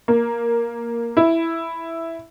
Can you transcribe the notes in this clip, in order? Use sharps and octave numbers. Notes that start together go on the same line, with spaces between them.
A#3
E4